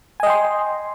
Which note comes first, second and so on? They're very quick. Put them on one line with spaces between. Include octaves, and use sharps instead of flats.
G#5 D#5 G5 C6